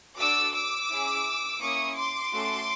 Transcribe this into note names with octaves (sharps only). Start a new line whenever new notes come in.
D4 F#4 A4 D6 E6
D6 E6
C#4 E4 G#4
A#3 C#4 E4 C#6 D#6
C6 D6
A3 C#4 F#4 A4